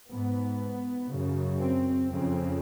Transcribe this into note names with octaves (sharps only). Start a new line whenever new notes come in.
G#2 B3
C#3
F#2
C4
F2 C#3 C4